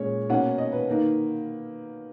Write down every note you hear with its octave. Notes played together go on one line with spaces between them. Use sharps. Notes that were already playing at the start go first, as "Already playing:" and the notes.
Already playing: A#2 G#3 C#4 C#5
B2 A#3 C#4 F#5
D#5
B4
D#3 A#3